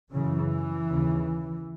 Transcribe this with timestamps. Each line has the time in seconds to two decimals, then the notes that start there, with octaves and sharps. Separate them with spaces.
0.12 F#2 C#3 E3
0.89 D#2 C#3